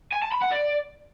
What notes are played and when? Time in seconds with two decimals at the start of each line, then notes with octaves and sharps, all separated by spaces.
0.13 G#5
0.22 A5
0.32 B5
0.42 F#5
0.51 D5